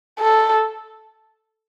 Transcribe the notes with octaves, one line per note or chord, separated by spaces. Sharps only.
A4